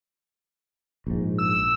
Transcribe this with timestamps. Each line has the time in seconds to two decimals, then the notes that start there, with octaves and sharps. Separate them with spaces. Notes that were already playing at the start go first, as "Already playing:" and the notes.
1.07 A#1 G#2
1.38 E6